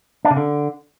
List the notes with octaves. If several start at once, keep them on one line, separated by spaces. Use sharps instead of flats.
D4
C#3
D3